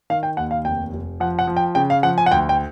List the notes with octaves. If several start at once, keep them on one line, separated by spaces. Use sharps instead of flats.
D#3 F5
G5
D#2 F#5
F5
F1 G5
F1
F3 F#5
F#5
F3
G5
C#3 G5
F5
F3 F#5
G#5
F#5
D2 G5
G5